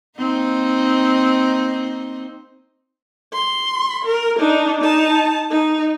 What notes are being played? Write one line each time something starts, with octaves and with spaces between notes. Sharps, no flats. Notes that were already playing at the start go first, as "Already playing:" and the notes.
A#3 C4 D#4
C6
A#4
D4 D#4
D#4 A5
D#4